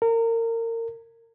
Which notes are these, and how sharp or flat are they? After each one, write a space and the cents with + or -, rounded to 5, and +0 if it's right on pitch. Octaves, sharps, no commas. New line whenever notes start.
A#4 -30